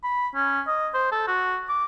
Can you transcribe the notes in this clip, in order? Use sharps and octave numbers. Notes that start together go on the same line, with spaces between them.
B5
C#4
D#5
C5
A4
F#4
D6